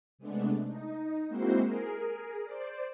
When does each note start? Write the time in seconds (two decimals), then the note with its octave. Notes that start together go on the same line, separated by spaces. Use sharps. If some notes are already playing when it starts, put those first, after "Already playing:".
0.18 C3 G#3 A3 B3 D4
0.65 D#4
1.28 G#3 A#3 C4 E4 F#4 C5
1.63 G#4 A#4
2.44 C5 D5